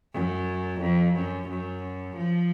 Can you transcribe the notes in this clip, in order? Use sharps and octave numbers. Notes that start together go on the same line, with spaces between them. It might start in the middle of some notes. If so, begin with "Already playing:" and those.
F#2
F2
F#2
F#2
F3